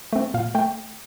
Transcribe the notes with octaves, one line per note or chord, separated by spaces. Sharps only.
A3 C4
A#2 F5
A3 G5